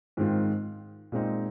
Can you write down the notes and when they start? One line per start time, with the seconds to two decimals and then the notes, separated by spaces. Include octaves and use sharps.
0.17 G#2 D#3 G#3 C4 F4
1.12 A#2 G#3 C4 D#4